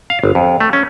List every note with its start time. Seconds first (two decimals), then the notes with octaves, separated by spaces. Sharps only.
0.10 F5
0.24 G1
0.35 F2
0.60 A3
0.73 C#4